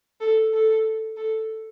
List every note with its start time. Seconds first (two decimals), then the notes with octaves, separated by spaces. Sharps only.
0.20 A4
0.54 A4
1.17 A4